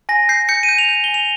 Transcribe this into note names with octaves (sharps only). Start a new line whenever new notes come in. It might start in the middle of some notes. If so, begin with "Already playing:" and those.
G#5 A#6
G6 C7
G6 C#7
D#7
G6
F7
G6
G#5 G7
F7